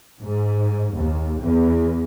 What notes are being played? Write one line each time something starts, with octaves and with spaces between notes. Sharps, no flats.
G#2
D#2
E2